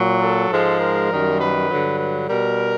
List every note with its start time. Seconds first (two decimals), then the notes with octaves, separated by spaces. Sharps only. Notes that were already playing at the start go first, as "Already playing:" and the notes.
Already playing: A#2 F#3
0.20 A4
0.50 G#2 F3 G#3
0.79 A#4
1.09 F#2 D#3 G3
1.39 B4
1.69 G2 D3 F#3
1.98 B4
2.28 B2 G3 A#4